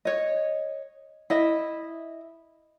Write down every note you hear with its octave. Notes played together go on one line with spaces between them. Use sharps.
C#5 D#5
E4 D#5 E5